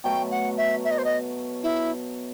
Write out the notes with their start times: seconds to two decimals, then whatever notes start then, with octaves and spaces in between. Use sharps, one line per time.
0.04 B2 F#3 A3 G5
0.31 F#5
0.57 E5
0.84 E5
0.91 D#5
0.98 C5
1.05 D#5
1.63 E4